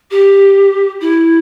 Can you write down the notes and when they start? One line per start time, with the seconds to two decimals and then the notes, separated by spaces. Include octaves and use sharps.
0.10 G4
1.00 E4